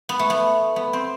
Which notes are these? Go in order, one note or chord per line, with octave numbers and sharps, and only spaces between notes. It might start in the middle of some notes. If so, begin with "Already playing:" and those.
B3
A3
B3
B3
C4